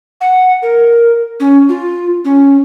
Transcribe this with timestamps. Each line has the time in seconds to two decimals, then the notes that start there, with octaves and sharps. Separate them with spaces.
0.21 F#5
0.62 A#4
1.40 C#4
1.69 F4
2.24 C#4